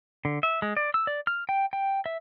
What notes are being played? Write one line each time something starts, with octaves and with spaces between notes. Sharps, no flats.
D3
E5
G#3
D5
E6
D5
F6
G5
G5
E5